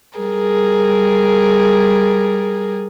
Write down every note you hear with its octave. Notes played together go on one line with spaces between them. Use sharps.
G3 G#4 A#4